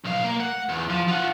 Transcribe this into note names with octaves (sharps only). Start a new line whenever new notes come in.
B1 F5
A#3
F#5
E2
F3
F4 F#5